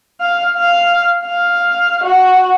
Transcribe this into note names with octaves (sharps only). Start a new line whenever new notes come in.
F5
F5
F5
F#4